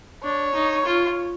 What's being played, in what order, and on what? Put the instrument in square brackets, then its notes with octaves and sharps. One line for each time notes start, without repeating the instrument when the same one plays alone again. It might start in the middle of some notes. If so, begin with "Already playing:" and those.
[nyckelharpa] D4 [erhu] C#5
[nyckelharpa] D#4
F4